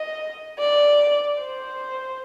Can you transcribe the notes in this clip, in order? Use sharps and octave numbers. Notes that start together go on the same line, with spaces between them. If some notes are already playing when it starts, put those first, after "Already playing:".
Already playing: D#5
D5
C5